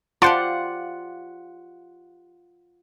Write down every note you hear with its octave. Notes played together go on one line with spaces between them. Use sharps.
F4 G4 C5 D5 F#5 A5 C6 C#7